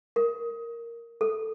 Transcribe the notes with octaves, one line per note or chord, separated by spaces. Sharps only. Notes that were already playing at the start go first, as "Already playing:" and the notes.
A#4
A4